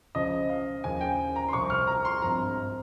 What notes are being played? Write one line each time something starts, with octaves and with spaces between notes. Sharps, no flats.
C#2 C#3 F3 D#5
F5
D#2 C#3 F3 G#5
G5
A#5
C6
C2 C3 F3 C#6
F6
A#5
C6
G#1 G2 F3 A#5